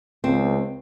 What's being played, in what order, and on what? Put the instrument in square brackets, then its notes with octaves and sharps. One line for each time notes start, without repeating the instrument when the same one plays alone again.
[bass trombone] C#2 [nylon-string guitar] C4